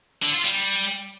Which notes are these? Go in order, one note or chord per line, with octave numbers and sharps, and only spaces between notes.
D3
F4
G3